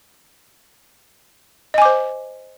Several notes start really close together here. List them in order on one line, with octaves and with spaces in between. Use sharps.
D#5 G#5 D6 C5